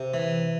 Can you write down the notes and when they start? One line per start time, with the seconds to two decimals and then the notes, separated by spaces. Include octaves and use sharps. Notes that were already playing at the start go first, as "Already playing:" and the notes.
Already playing: C3
0.14 E3